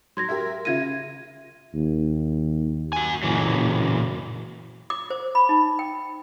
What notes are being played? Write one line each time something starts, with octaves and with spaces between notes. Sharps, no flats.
F#3 C6 G#6 A#6
G4 A#4 E5
C#3 F4 E5 G#6 A#6 D#7
D#2
F#4 G#5
F#1 A#2 E3 F#3
D6
C5
B5
D#4
G5